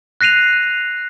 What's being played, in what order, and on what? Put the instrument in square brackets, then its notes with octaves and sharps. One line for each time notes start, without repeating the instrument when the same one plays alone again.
[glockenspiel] F#6 A#6 C7 D#7 F7